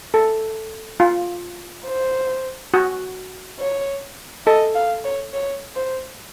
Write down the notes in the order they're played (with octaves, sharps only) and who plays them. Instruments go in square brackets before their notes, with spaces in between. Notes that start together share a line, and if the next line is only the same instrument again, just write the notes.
[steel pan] A4
F4
[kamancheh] C5
[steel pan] F#4
[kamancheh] C#5
[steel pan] A4 [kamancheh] D#5
[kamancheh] F5
C#5
C#5
C5